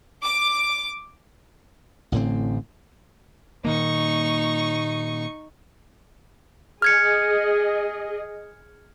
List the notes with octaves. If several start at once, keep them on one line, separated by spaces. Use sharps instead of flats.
D6
A1 A2 D3 C4
A#2 D#3 A#3 D#4 C#6
G#4 D#5 F6 G#6 C#7